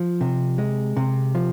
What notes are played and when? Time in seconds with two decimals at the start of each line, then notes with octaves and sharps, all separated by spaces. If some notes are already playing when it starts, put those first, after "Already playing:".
Already playing: F3
0.21 C3
0.58 G#3
0.97 C3
1.35 F3